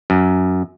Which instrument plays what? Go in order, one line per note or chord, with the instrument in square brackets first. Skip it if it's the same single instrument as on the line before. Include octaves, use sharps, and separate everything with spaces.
[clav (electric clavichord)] F#2